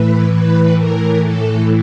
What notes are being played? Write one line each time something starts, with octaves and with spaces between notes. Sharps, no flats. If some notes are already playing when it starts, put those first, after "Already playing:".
Already playing: A2 E3 B4
B4
A#4
A4